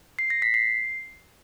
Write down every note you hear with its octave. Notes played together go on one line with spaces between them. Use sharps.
C7
A#6
B6
C7